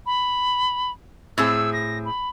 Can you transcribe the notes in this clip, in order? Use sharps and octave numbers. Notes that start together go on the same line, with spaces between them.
B5
A2 C4 G#4 E6
A#6
B5